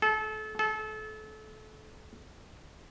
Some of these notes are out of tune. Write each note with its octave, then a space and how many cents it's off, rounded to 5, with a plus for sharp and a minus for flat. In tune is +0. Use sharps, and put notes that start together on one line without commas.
A4 -30
A4 -30